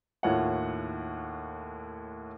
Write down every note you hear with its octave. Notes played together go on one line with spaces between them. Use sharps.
D#2 A2 E4 F4 C#5 F#5